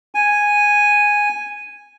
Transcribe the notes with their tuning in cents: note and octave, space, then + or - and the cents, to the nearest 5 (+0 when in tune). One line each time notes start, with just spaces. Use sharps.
G#5 -5